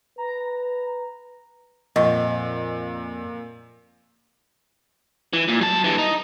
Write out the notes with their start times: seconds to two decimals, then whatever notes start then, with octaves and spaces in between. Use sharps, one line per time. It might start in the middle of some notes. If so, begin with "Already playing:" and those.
0.18 B4 A#5
1.96 F2 A#2 D#5 F#5 C#6
5.33 E3
5.48 A#2
5.61 F#3 A5
5.84 G2 E3
5.98 D#4